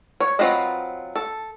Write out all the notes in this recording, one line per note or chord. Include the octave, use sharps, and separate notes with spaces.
C#5
F#3 C4 F4 B4 D#5
A4